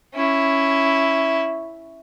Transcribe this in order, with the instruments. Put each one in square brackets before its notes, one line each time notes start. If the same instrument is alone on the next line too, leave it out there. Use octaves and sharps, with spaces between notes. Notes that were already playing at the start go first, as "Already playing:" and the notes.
[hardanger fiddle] C#4 E4